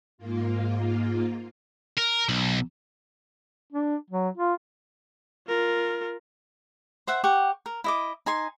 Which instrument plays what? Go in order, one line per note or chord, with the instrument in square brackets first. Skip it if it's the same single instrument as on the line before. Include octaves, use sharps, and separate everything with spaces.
[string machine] G#2 A#3 F4
[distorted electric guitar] A#4
B1
[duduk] D4
F#3
F4
[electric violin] F4 A#4
[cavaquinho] C5 E5 F#5
G4 F#5 C#6
A#4
E4 D#5 D6
D#4 G#5 C6